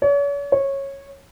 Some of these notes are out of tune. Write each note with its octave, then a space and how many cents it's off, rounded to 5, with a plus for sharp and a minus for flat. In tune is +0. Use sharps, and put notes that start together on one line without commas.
C#5 +40
C#5 -15